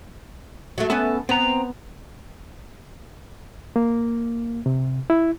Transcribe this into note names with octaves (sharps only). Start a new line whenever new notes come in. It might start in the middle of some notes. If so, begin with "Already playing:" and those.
F#3 A3
B3 C#4 A4
B3 C4 A#5
A#3
C3
E4